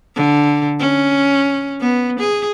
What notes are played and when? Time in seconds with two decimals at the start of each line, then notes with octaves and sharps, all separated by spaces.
0.16 D3
0.80 C#4
1.81 B3
2.20 G#4